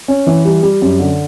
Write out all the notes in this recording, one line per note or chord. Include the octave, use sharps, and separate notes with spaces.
C#4
E3
G3
G3
F#2
D3